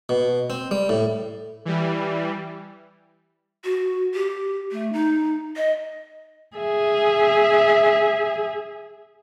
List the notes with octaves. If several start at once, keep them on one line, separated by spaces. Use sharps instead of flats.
B2
C4
G3
A2
E3 G3
F#4
G4
A3
D#4
D#5
G#4 E5